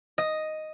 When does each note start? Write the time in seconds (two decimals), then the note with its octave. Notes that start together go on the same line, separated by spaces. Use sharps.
0.18 D#5